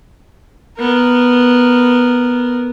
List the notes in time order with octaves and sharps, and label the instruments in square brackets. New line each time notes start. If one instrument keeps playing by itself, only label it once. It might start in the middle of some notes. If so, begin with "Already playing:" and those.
[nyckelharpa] B3 A#4